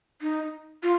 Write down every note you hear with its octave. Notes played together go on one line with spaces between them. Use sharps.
D#4
F4